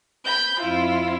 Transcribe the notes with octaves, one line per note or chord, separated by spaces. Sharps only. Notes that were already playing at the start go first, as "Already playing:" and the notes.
B5 G6
F2 E4 F4